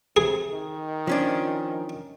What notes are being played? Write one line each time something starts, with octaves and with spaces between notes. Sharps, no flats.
C3 G#4
D#3
F3 C#4 D4